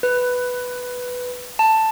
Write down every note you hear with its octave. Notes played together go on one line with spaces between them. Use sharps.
B4
A5